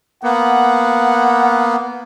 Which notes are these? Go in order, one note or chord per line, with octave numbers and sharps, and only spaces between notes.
A#3 B3 F#5